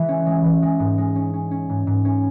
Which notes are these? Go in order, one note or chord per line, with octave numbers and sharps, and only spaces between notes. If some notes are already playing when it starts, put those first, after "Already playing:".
Already playing: E3 G#3
C#4
G#3
E3
G#3
G#2
G#3
C#4
C#4
C#4
G#2
G#2
C#4